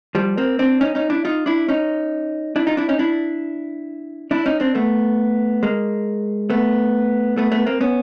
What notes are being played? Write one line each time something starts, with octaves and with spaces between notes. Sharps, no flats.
F3 G3
A#3 C4
C4 D4
C#4 D#4
C#4 D#4
D4 E4
D#4 F4
D4 E4
C#4 D#4
D4 E4
D#4 F4
D4 E4
C#4 D#4
D4 E4
D4 E4
C#4 D#4
C4 D4
A3 B3
G#3 A#3
A3 B3
A3 B3
A3 B3
A#3 C4
B3 C#4